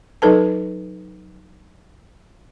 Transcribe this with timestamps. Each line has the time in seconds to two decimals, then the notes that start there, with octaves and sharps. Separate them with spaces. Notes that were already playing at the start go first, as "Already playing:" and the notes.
0.22 F#3 D#4 A4 B4 A5